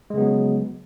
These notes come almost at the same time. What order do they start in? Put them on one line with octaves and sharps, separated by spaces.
G#3 C#3 B3 F#3